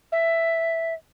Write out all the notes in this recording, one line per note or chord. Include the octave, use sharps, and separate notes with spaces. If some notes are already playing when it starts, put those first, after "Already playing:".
E5